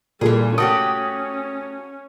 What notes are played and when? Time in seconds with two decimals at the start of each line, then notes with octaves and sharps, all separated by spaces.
0.21 A#2 E3 G3 G#4 A4
0.58 A3 C#4 F#4 G4 D#6